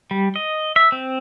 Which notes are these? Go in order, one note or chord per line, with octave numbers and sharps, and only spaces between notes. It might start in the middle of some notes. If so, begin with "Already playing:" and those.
G3
D#5
E5
C4